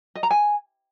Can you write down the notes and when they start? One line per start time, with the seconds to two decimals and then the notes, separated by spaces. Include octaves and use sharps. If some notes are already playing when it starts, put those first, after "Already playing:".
0.15 D#5
0.23 A#5
0.31 G#5